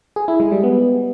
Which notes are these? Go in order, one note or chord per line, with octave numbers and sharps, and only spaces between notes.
G#4
E4
G#3
G3
B3